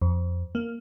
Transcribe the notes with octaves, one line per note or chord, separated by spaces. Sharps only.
F2
A#3